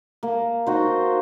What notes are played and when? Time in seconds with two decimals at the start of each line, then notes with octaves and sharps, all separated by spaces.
0.23 A#3
0.66 D#4 F#4 C5